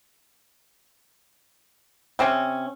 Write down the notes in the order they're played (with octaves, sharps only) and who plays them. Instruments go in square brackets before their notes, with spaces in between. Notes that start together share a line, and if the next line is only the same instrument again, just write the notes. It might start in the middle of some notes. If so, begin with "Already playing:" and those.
[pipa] C3 C4 C#4